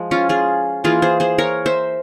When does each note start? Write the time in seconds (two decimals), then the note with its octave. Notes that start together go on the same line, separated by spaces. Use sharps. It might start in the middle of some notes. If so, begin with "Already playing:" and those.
Already playing: F3 G#3
0.11 C#4 F4
0.29 F4 G#4
0.84 E3 A#3 F4 G#4
1.02 G#4 C5
1.20 G#4 C5
1.38 A#4 C#5
1.66 C5 E5